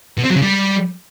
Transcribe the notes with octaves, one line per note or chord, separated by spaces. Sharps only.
B2
C4
F#3
C#3
G3